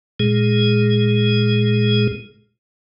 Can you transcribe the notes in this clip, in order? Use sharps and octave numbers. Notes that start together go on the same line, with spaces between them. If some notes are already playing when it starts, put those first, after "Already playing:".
A#2 G#3 G#4